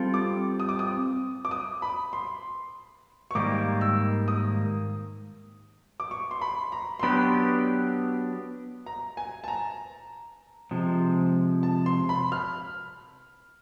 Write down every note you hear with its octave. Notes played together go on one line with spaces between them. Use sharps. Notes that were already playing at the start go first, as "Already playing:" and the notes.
Already playing: G3 C4 F4 A4
D6
D#6
D6
D#6
D6
D#6
B5
C6
C#6
G#2 D#3 G3 A#3 D6
E6
D#6
D6
C#6
C6
B5
A#5
C6
F#3 B3 D4 G4 B5
A#5
G#5
A5
A#5
C3 F3 G#3
A5
C6
B5
F6